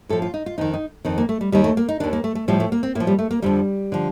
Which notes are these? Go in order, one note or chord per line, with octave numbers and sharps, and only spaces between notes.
A2 F3 A4
F4
D#4
F4
F2 D#3 D#4
D#4
F2 D#3 C4
A#3
A3
G3
D#2 D#3 G3
A3
A#3
D#4
D#2 D#3 D4
A#3
A3
A3
A2 F3 G3
A3
A#3
C4
A2 A#3
F3
G3
A3
A#3
F2 D3 F3 G3
D3 F3